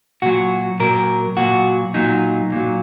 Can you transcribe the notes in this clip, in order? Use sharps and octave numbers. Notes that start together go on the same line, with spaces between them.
A#2 F#3 F#4
A#2 F#3 A#4
A#2 F#3 F#4
A#2 F#3 D#4
A#2 F#3